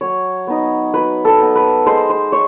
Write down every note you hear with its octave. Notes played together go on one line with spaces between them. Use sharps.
F#3 C#5
B3 D#4
F#3 B4
A4
B3 D#4
B4
G#3 C5
C5
C#5